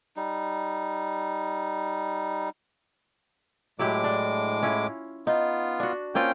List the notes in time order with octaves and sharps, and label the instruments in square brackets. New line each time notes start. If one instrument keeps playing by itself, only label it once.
[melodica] G3 D#4
[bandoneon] A2 G#3 D6 [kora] F#3 E4 G4
[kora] D4
C#4 E4 F4
[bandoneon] B3 F4 [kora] D#4
[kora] D4 F#4
[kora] A#3 C4 F4 [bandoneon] C#4 G5 G6